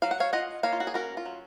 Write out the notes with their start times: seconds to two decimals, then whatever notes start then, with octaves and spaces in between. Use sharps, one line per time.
0.02 F#3 F5
0.11 F#5
0.20 C#5 F5
0.33 F4 D#5 F#5
0.63 A#3 C#5 F5
0.73 F4
0.80 F#4
0.87 G#4
0.94 C#4 F#4 A#4
1.17 F4
1.26 F#3